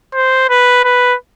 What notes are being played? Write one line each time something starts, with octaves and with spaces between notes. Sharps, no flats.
C5
B4
B4